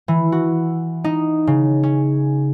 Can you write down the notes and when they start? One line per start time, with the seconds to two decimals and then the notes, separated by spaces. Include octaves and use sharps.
0.08 E3
0.32 F#4
1.04 D#4
1.47 C#3
1.83 C#4